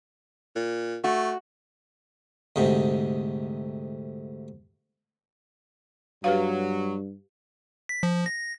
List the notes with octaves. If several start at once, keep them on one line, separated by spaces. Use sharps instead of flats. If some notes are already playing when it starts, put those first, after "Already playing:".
A#2
A3 F#4
D2 G#2 C3
G2 F#3 G4 B4 F5
B6
F3
A#6